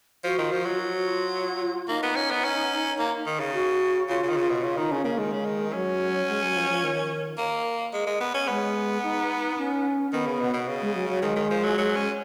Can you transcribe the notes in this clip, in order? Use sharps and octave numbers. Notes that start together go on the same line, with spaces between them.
F3 F#4
D#3 F4
F3 F#4
F#3 F4
F#4
F4
A#3 D#4
B3
C#4
B3
C#4
A#3
D#3
C#3
F#4
C#3 F4
C#3
D#3
C#3
B2
C#3 F4
D#3 D#4
C#3 C#4
C#3 A#3
D#3 G#3
C#3
D#3
F#3 C#4
G#3
F#3
F3
F3
D#3
A#3
G#3
G#3
B3
C#4
G#3 B3
D#4
C#4
D#3 B3
C#3
B2
B2
C#3
G#3
F#3
F#3
D#3 G#3
D#3
F3
F#3
F#3
C#4